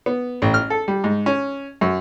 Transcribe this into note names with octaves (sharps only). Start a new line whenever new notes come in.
B3
A1
F6
A4
G3
G#2
C#4
F#2